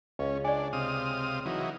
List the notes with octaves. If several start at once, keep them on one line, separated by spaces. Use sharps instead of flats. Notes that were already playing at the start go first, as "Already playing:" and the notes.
C#2 C#4
D4 D5 G#5
C3 F5 D#6
E3 F#3 D#4